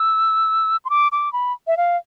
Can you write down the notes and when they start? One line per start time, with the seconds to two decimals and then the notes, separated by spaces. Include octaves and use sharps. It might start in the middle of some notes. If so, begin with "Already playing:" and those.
Already playing: E6
0.85 C6
0.90 D6
1.12 D6
1.33 B5
1.67 E5
1.77 F5